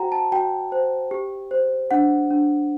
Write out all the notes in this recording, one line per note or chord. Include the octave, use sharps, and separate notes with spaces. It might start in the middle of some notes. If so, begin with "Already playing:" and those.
Already playing: F#4 C5 F#5 G5 A#5
A5
F#4 G5
C5
G4
C5
D4 F#5
D4